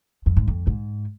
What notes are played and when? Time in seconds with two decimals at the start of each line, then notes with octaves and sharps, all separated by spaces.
0.26 F2
0.37 G#2
0.48 F2
0.67 G#2